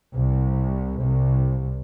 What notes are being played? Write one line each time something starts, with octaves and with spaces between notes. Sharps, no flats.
C2
C2